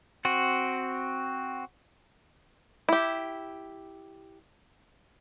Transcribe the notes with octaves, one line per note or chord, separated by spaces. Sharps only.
C4 F#4
E4 G4